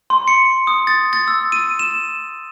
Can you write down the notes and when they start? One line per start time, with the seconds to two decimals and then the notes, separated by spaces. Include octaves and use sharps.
0.10 C6
0.28 C#7
0.67 D#6
0.87 A6
1.13 A6
1.28 E6
1.52 D#7
1.79 E7